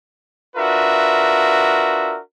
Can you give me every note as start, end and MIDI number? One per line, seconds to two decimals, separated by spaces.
0.56 2.17 62
0.56 2.17 65
0.56 2.17 66
0.56 2.17 70
0.56 2.17 71
0.56 2.17 76